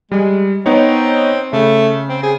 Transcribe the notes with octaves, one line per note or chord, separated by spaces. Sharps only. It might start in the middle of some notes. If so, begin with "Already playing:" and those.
G3 G#3
B3 C4 D#4 C#5
C#3 A3
C4
G#4